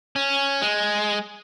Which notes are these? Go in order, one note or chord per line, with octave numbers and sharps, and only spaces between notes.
C#4
G#3